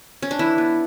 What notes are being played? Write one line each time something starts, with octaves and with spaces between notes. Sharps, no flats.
C#4
D4
E3 E4
B3